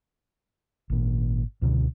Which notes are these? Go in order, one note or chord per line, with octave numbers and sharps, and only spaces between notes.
G#1 A#2
C#2 B2 D3